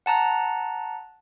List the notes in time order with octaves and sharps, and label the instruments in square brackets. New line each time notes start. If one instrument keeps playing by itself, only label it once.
[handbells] F#5 A5 A#5 F#6